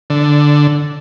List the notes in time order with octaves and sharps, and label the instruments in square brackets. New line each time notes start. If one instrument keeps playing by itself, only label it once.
[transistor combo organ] D3